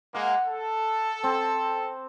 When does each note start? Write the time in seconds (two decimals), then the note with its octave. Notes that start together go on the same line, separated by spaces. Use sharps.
0.15 G#3 A#3 F#5
0.45 A4
1.23 C4